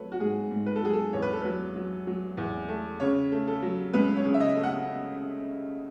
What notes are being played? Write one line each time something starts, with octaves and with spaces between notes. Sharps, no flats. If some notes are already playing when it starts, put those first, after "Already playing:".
Already playing: F#3 A3 B4 C#5
F#4
G#2 G#4
G#2
B4
A4
F#3 G#4
A4
E2 C#5
B4
A4
F#3 B4
F#3
F#3
E2
A3
C#3 C#5
A3
A4
F#3
C#2 B4
C#5
C#3
E5
D#5
A3
F#5